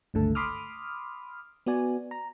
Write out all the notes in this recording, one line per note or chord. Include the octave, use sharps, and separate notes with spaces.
G1 C#2 D3 A3 A4
B5 C6 D6 D#6 F6
B3 F#4 D5 G#5
A#5